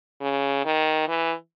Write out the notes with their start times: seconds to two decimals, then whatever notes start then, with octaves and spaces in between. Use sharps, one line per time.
0.21 C#3
0.65 D#3
1.08 E3